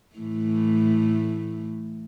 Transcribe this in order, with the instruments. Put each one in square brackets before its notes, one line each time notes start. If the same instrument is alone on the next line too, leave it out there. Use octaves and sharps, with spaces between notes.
[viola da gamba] A2 E3 A3